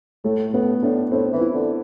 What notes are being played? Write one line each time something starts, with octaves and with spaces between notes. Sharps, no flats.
A2 A3
A2 B3
A2 D4
A2 C4
E3
E4
D3